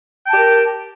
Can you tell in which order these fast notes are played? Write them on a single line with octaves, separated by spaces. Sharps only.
G5 A5 G4 A#4